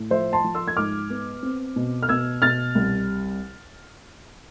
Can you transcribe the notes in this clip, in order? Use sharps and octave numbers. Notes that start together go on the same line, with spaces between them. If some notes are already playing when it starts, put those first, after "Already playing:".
Already playing: A2
F3 C5 E5
A5 C6
F3
C6 E6
G#6
G#2 D6 F6
B3
C4
B2
F6
B2 E6 G#6
B2 F6 A6
C2